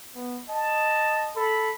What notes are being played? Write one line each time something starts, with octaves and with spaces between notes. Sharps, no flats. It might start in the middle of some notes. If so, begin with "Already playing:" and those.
B3
D#5 A5
A4 B5